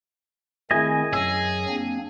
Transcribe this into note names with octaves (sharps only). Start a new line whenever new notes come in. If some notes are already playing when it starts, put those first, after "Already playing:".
D#3 A3 C4 E4 G#4 D#5 G#5
F#2 F#3 G#4 E6
A#3 C4 D4